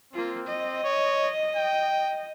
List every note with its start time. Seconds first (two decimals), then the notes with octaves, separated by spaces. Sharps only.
0.13 A#3 C4 F4
0.47 D#5
0.84 C#5
1.56 G5